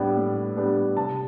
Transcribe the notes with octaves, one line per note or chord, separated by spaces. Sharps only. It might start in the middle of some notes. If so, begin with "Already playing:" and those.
Already playing: A2 G3 B3 D4
A2
G3 B3 D4
C3 A5